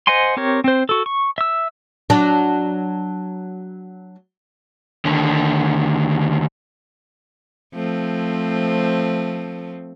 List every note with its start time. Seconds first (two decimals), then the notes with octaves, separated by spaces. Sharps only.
0.07 C5 D#5 F#5 G#5 C6
0.37 C4 G4 A#4 C#5
0.64 C4 C5
0.89 F#4 A4
1.06 C#6
1.38 E5 E6
2.10 F#3 D4
5.05 D#2 D3
7.75 F3 A3 C4